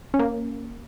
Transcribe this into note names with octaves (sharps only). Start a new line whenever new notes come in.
C#4
A#3